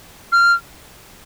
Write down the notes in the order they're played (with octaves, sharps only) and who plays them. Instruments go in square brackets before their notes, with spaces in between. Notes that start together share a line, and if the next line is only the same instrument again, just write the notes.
[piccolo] F6